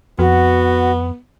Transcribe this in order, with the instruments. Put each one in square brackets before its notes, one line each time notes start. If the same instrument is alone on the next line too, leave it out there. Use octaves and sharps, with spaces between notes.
[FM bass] F2 [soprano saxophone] B3 [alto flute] F#4